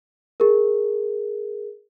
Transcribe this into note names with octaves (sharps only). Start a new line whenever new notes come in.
G#4 A#4